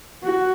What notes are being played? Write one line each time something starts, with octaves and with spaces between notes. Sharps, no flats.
F#4